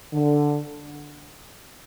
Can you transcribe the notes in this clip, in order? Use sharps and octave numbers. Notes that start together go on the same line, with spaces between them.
D3